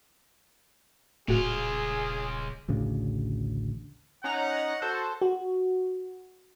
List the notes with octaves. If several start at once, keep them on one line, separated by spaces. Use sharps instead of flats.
D#1 A2 C#3 F4 F#4 G#4
A1 D2 C#3
C#4 D#4 F#5 A#5
F#4 A4 C5 A5
F#4